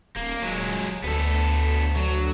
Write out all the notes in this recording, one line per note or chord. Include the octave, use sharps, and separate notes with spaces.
D#1 A#3
F#3 G#3
D2 B3 A4
F#3